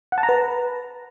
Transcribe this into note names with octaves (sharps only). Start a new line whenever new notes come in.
F#5
A5
A#5
B4